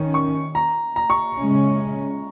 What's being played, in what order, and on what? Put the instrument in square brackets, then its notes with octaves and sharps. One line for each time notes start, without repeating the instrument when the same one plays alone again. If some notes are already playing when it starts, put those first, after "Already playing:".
Already playing: [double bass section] D#3 C#4
[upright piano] C#6
A#5
A#5
C#6
[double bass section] C#3 G#3 C#4